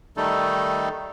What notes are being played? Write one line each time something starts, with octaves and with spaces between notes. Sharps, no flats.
D#3 G3 A3 D#4 A4